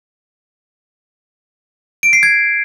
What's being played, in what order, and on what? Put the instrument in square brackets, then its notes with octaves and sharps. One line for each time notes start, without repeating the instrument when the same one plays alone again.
[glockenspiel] D7
C7
G#6